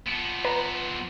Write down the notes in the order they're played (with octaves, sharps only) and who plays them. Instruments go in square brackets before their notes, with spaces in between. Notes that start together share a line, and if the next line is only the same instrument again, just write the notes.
[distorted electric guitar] F3 B3 [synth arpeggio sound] C#7
[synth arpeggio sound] B4 A#5